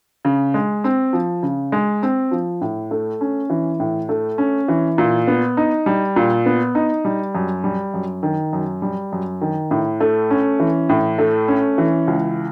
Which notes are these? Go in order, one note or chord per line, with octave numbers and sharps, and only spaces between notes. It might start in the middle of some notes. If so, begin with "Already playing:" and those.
C#3
G#3
C4
F3
C#3
G#3
C4
F3
A2
A3
C#4
E3
A2
A3
C#4
E3
A#2
B3
D#4
G3
A#2
B3
D#4
G3
F#2
G3
F#2
D#3
F#2
G3
F#2
D#3
A2
A3
C#4
E3
A2
A3
C#4
E3
C#2